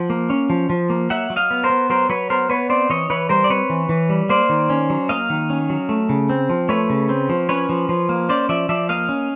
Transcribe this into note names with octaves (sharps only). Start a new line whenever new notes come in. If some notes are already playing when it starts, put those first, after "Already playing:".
Already playing: F3 F#5
A#3
C#4
F3
F3
A#3
F#3 E5 F#5
F#3
D#5 F5
B3
A#4 C5
B3
F#3 A#4 C5
F#3 B4 C#5
B3 A#4 C5
B3 B4 C#5
C4 C5 D5
E3 C#5 D#5
E3 B4 C#5
G3 A#4 C5
D5
C4 B4 C#5
E3
E3
G3
A#3 C5 D5
D#3
C#4
F#3
A#3 D#5 F5
D#3
C#4
F#3
A3
C#3
C4
F3
A3 B4 C#5
C#3
C4
F3
C#4 B4 C#5
F3
F3
A#3
C#4 C5 D5
F3 D5 E5
F3 D5 E5
A#3 D#5 F5
C#4